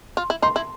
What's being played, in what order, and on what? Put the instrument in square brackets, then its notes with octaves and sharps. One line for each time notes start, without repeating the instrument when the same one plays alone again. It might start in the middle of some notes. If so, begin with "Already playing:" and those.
[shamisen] F4
E4
[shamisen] D#4 [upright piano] C6
[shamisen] E4